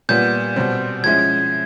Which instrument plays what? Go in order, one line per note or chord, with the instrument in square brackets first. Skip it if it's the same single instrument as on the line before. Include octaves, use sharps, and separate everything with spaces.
[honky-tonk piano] A#2 G3 B3 [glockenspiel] G6
[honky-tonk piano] B2 G3 C4
[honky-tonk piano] F3 G#3 C#4 E4 [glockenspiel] G#6